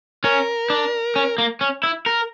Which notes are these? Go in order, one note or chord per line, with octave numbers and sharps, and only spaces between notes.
C#4 A#4
D4
C#4
A#3
C#4
E4
A#4